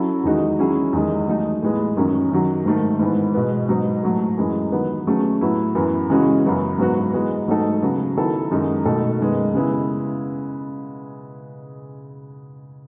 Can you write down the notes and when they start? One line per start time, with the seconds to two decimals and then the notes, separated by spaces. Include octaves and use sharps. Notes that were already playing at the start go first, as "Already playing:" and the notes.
Already playing: F#3 C#4 E4 A4
0.24 E2 D#3 G#3 D#4 F#4
0.59 F#3 C#4 E4 G#4
0.93 E2 D#3 G#3
1.28 F#3 A3 D#4
1.62 A2 E3 G#3 B3
1.97 F#2 D#3 F#3 C#4
2.31 F#2 D#3 F#3
2.65 G#2 D#3 A3
2.99 G#2 E3 B3
3.34 B2 G#3 B3
3.69 G#2 F#3 B3 D#4
4.03 A2 F#3 A3
4.38 F#2 E3 G#3
4.72 D#3 F#3 B3
5.07 F#3 A3 C#4 G#4
5.41 A2 F#3 B3 E4
5.75 F#2 E3 B3
6.10 C#3 E3 G#3 C#4 F#4
6.45 F#2 C#3 F#3 B3 E4
6.78 G#2 F#3 B3 F#4
7.13 E3 G#3 B3
7.48 G#2 F#3 A3 D#4 A4
7.82 C#3 F#3 B3
8.17 D#3 F#3 B3 E4 A4
8.51 F#2 D#3 G#3 D#4
8.85 B2 A3 D#4 A4
9.20 F#2 D#3 G#3 B3
9.54 C#3 G#3 B3 E4